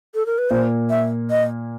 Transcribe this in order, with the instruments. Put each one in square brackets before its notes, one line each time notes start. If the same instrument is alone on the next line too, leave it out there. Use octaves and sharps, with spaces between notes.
[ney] A4
A#4
B4
[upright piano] A#2 A#3 [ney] C5
[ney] E5
D#5